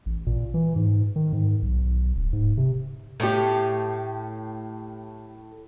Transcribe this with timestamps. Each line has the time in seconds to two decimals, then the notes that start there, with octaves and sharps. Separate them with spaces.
0.06 A1
0.26 A#2
0.54 E3
0.76 G#2
1.16 D#3
1.33 G#2
1.62 B1
2.16 D1
2.33 G#2
2.57 C3
3.20 A2 A3 G4